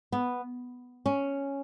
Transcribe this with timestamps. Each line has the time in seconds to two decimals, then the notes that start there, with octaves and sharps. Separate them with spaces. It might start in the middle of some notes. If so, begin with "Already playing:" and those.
0.12 B3
1.06 C#4